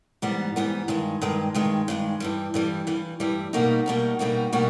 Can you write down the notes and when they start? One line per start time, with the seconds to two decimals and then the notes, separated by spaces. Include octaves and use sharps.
0.22 G#2 E3 G3 B3
0.56 G#2 E3 G3 B3
0.88 G2 D#3 G#3
1.21 G2 D#3 G#3
1.54 G2 D#3 G#3
1.88 G2 D#3 G#3
2.20 G2 E3 G3
2.54 G2 E3 G3
2.87 G2 E3 G3
3.20 G2 E3 G3
3.53 B2 G3 A#3 D#4 F#4
3.86 B2 G3 A#3 D#4 F#4
4.19 B2 G3 A#3 D#4 F#4
4.53 B2 G3 A#3 D#4 F#4